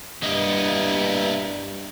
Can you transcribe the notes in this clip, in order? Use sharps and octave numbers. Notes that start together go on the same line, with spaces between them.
G2 A#3 B3 E4 D#5